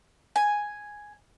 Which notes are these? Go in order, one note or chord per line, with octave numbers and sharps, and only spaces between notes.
G#5